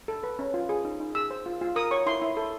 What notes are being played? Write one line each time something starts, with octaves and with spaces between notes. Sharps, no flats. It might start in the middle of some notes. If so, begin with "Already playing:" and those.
A4
B4
C#4
F4
G#4
D#4
D#4
G#4 E6
C5
F4
F4
A#4 D#6
C#5 C#6
E4 C6
E4
A4